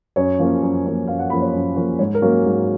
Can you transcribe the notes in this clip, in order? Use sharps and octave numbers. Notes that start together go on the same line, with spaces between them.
F#2 C#5
F3 A#3 C#4
F#2
F3 A#3 C#4
F#2 F5
F#5
F3 A#3 C#4 B5
C#5
F#2
F3 A#3 C#4
G#2 C#5
A#4
F#3 A#3 C#4
G#2